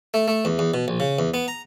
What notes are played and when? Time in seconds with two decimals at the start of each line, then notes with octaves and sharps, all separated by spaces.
0.14 A3
0.28 A3
0.45 E2
0.59 E2
0.74 B2
0.88 A#1
1.00 C#3
1.19 E2
1.34 B3
1.48 A#5